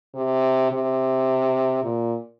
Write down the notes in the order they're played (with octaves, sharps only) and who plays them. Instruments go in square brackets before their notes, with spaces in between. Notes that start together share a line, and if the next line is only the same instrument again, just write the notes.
[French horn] C3
C3
A#2